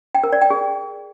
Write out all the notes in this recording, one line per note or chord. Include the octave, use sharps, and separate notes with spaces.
G5
A#4
D5
G5
G#4